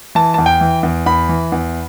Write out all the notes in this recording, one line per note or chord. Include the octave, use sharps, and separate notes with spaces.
E3 A5
E2 A5
G5
E3
E2
E2 B5
E3
E2